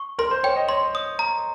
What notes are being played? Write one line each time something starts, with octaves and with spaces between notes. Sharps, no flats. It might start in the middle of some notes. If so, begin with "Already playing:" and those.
Already playing: C#6
A#4 C6
C5
C#5 G5
D#5
C#5 C6
D#6
A#5